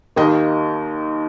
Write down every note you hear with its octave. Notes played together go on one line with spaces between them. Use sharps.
D#2 D#3 A#3 D#4 D#5